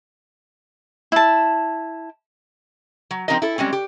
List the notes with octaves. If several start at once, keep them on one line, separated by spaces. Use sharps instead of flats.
E4 A5
F#3
F3 C4 D#4 G4 A#4 D#5
E4 A4
G3 G#3 C4 C#4
G4